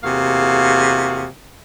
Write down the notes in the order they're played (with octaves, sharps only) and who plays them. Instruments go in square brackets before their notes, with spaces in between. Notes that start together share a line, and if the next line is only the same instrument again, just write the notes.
[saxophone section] E2 C3 A#3 F#4 G#4 F5